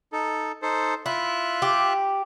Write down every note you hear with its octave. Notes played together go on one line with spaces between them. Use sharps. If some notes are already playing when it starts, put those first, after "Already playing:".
D#4 A4
D#4 A4 C5
E4 F4 E5 F#6
G4